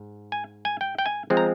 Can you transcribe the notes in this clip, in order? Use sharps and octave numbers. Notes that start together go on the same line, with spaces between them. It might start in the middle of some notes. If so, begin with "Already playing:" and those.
Already playing: G#2
G#5
G#5
G5
G5
G#5
F3 G#3 C4
A#5